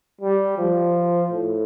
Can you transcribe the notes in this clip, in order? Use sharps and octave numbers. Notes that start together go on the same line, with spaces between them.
G3
F3
A2